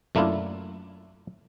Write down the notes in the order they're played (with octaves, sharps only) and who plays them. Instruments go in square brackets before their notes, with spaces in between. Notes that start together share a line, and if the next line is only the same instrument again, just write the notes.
[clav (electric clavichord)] F#2 A3 A#3 D4 E4 F4